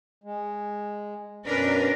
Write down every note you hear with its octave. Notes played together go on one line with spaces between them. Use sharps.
G#3
F#2 B2 C#4 D4 A#4 B4